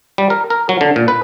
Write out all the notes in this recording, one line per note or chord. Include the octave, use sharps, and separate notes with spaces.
G3
A#4
A#4
F#3
D3
A#2
B4